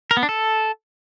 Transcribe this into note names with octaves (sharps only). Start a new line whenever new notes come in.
A#4
B3
D4
A4